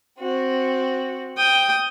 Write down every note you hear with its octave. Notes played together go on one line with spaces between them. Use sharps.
C4 F#4
G5 D#6